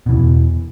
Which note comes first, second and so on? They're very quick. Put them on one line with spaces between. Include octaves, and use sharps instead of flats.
B2 E3 E2